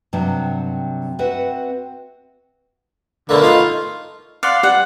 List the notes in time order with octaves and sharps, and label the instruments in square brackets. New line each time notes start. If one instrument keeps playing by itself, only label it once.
[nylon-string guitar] G2 C3 F#3
C4 F#4 B4 E5 F#5
[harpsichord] B2 A3 A#3 [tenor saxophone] D3
[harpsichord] A3 D#4 [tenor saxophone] F4
[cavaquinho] D5 [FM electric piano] F5 F#5 C6
[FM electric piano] G3 [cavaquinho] F#5